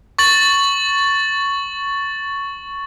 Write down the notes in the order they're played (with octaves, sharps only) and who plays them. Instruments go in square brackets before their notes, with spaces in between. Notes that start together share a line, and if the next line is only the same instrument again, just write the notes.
[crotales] C#6 A6 F#7